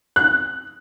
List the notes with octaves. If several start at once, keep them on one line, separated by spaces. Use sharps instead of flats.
F#6